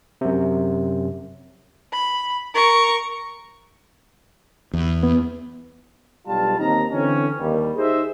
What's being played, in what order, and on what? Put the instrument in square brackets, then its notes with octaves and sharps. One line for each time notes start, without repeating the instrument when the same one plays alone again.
[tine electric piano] F#2 C3
[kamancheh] B5
A#4 C#6
[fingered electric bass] E2
[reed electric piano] B3
[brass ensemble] B1 G2 G3 F4 A5
D#2 C4 D#4 A#5
D3 E3 C4 C#4
D#2 G3
D#4 G4 G#4 C5 D#5 E5